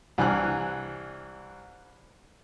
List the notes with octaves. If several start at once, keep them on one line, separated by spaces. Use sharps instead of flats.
C2 E3 D4 G#5 F6 F#6